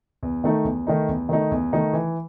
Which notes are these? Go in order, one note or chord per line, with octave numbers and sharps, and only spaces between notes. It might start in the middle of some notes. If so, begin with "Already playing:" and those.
E2
D#3 A3 D#4
E2
D#3 A3 D#4
E2
D#3 A3 D#4
E2
D#3 A3 D#4
E3